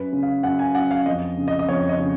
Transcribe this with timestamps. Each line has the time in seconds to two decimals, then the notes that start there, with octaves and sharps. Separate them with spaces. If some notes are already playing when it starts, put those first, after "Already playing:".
Already playing: F#2 B4
0.13 C#3
0.23 F5
0.43 F#2 F#5
0.59 G#5
0.75 F#2 F#5
0.91 F5
1.06 F2 D#5
1.37 C#3
1.48 D#5
1.59 D#5
1.68 F2 C#5
1.89 D#5
2.00 C#3